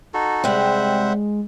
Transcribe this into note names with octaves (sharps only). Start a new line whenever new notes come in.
D#4 F#4 A4
C3 G3 G#3 C5 E5 F#5